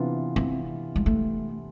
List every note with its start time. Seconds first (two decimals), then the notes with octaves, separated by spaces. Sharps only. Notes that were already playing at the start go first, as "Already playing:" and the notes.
Already playing: C3 E3 B3 D4 F4
0.36 C4
0.96 G#3
1.06 A3